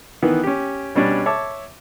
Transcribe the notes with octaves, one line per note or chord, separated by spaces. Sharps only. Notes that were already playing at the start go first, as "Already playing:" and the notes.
D#3 E3 B3
C#4 G4
B2 G3 C#4 D4
C#5 E5 A5 D6